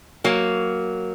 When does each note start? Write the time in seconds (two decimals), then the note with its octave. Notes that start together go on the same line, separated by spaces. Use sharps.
0.24 F#3 A#3